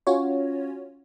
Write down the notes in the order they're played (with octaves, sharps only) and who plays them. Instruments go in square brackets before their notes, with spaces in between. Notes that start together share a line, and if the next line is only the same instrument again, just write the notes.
[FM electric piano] C#4 F4 F#4 C#5